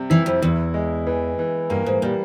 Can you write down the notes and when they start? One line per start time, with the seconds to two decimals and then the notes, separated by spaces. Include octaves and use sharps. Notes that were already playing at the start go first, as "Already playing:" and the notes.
Already playing: C3 G3
0.10 E3 E4
0.26 F2
0.42 E2 E4
0.74 G#3
1.07 E3
1.39 E3
1.70 G2 A#3
1.86 G#2
2.02 A#2 G3